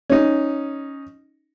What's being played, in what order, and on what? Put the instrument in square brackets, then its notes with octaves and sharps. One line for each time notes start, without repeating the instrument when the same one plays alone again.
[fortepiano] C#4 D#4